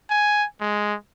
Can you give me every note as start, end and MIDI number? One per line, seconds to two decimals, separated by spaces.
0.10 0.45 80
0.61 0.94 56